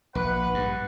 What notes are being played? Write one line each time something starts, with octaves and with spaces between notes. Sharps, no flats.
A#1 B4 F#5
G2